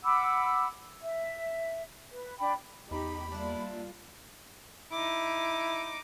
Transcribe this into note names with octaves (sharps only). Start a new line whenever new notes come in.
F#5 B5 D6 E6
E5
B4
D4 G5 B5
E2 D#4 G4 B5
G3 A#3 D4 E4 F4
D#4 E4 D6